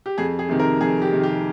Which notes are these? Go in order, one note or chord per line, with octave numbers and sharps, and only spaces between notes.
G4
F2 G#4
G#4
C3 D#3
A#4
F2 G#4
G4
C3 D#3
G4